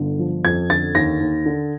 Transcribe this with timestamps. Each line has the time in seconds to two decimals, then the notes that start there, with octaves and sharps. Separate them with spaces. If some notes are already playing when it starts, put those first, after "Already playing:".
Already playing: G1 D3
0.19 F3
0.45 F2 G#6
0.70 D3 A6
0.95 D#2 A#6
1.20 D#2
1.46 D3